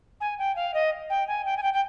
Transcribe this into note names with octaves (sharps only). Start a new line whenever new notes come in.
G#5
G5
F5
D#5
G5
G#5
G5
G#5
G5
G5